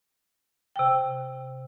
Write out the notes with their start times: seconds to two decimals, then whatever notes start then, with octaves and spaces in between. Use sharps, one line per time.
0.76 C3 G5